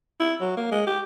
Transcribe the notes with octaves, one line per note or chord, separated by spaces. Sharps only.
E4
F#3
A#3
G#3
G4